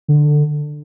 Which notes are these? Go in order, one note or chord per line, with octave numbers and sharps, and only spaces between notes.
D3